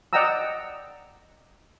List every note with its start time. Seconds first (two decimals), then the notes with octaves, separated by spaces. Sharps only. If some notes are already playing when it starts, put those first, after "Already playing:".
0.13 D5 D#5 F#5 G5 A#5 E6